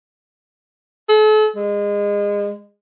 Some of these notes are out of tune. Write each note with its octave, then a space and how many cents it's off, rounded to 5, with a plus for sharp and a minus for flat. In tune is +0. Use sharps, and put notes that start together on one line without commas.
A4 -40
G#3 -25